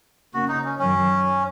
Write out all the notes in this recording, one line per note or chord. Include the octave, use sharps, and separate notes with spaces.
C#3 A#3 C#4 F#4
D#4
C#4
F#2 D#3 F#3 C#4